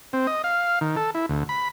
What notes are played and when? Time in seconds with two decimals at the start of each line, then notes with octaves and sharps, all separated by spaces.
0.13 C4
0.27 D#5
0.44 F5
0.81 D#3
0.97 A4
1.15 E4
1.29 D2
1.49 B5